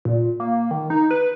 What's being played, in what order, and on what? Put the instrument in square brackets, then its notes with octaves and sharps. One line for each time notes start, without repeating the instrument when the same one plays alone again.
[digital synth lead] A#2
A#3
D#3
D#4
B4